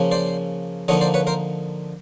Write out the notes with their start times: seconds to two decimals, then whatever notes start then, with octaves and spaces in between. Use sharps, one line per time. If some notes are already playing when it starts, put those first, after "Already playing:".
Already playing: C#3 F3 A#3 C#4
0.12 C5 D5
0.88 D3 F3 A#3 D#4 C#5 D#5
1.01 C5 D5
1.14 B4 C#5
1.27 A#4 C5